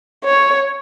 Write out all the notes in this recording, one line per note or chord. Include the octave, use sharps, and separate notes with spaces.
C#5